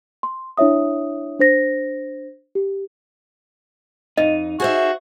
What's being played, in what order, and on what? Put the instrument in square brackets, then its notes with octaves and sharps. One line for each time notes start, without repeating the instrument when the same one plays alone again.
[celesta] C6
D4 E4 C#5 E5 D#6
D4 C5 A#6
G4
[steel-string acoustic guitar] F2 [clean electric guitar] D#4 [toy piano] D#5
[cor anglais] F#4 [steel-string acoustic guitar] G#4 C5 E5